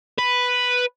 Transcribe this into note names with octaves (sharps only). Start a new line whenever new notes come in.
B4